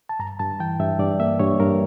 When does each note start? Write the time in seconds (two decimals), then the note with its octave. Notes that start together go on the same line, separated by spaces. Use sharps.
0.09 A5
0.19 G2 A#5
0.39 G2 A5
0.60 E3 G5
0.80 G2 E5
0.99 G2 D5
1.20 A#3 E5
1.39 G2 C#5
1.60 G2 A#4